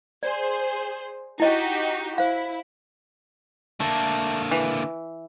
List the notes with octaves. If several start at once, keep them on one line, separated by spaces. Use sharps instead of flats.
G#4 C5 D5
D#4 E4 F#4 G4 D#5
E4 C5 F5
D3 A3 A#3
E3